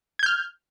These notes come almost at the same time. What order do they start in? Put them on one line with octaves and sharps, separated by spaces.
G#6 G6 F6